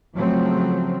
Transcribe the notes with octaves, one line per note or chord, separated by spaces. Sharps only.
C#3 F3 F#3 A3 C4